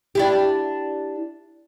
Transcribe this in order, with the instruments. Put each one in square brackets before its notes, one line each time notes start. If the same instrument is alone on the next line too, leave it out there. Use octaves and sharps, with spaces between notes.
[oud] D4 E4 G4